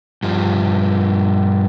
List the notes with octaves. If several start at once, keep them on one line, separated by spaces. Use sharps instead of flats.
G2 F3